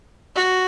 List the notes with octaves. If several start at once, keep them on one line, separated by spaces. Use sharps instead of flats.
F#4